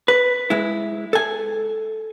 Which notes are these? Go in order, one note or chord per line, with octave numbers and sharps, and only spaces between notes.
B4
G#3 E4
A4 G#5